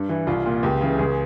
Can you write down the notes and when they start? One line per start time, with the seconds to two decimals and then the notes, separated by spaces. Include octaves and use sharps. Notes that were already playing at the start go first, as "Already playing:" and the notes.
Already playing: G2
0.09 E3
0.27 C2 F4
0.46 A#2
0.63 C#2 G4
0.81 C#3 E3
0.98 C#2 G#4